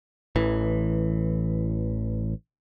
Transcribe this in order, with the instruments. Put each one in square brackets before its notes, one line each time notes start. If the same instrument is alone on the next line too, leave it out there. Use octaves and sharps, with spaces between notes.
[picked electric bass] A1 E3